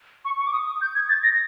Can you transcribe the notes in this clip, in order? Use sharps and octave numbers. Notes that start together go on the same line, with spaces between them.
C#6
C#6
D6
D#6
D#6
G6
G#6
A6
A#6